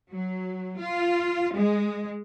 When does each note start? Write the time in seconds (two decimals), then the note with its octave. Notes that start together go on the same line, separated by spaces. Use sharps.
0.12 F#3
0.80 F4
1.55 G#3